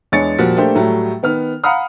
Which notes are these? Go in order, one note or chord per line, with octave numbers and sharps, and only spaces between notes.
E2 G#3 D4 C#5 A6 C#7
A#2 F3 G3 F#4
A3 A#3 D4 G4 C5
A2 F#3 G3 A3
D#3 B3 F6
F5 F#5 A#5 B5 D#6 F6